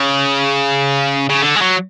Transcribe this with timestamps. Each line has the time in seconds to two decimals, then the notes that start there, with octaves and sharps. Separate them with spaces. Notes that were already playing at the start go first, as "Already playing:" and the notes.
Already playing: C#3
1.30 C#3
1.42 D3
1.56 G#3
1.61 F#3